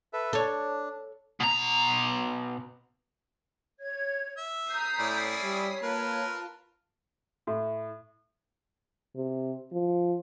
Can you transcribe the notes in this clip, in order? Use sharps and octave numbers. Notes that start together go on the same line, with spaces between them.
A4 B4 E5
D4 A4 C#5
B2 A#5
C#5 G#6
E5
A#5 D#6 G6 B6 C7
A2 C#4 E4 D5
G3 C#5
A#3 F4 A#4 B4 A5
A2
C3
F3